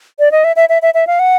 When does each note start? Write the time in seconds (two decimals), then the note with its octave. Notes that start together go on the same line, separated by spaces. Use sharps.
0.19 D5
0.32 D#5
0.44 E5
0.56 E5
0.69 E5
0.82 E5
0.94 E5
1.07 F5
1.19 F#5